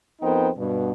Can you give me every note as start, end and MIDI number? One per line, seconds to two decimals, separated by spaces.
0.21 0.49 41
0.21 0.49 59
0.21 0.49 63
0.21 0.49 70
0.21 0.49 72
0.21 0.49 79
0.56 0.91 43
0.56 0.91 47